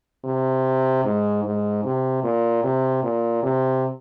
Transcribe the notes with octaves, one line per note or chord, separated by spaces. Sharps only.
C3
G#2
G#2
C3
A#2
C3
A#2
C3